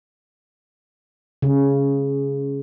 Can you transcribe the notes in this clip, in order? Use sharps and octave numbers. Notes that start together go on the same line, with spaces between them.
C#3